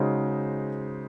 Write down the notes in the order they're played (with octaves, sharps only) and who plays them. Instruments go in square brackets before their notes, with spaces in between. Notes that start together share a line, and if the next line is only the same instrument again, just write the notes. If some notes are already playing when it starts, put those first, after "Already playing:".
Already playing: [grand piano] C#3 G#3 D#4 F#4 C5